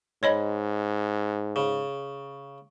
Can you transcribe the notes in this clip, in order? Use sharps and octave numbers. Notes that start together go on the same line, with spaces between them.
G#2 C#5 D#5 B5
C#3